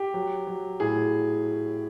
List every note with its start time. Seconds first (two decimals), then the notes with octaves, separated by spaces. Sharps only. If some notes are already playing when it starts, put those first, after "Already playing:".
Already playing: G4
0.14 F#3
0.47 F#3
0.80 A2 G#4